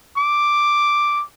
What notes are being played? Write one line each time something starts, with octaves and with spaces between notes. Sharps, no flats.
D6